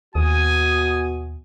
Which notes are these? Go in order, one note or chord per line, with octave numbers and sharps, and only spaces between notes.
D#2 B2 F#4 G#5 D#6